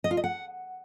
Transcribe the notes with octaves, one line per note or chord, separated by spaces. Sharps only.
D#5
F4
D#5
F#5